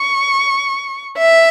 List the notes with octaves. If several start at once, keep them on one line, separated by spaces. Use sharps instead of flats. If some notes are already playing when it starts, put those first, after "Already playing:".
Already playing: C#6
E5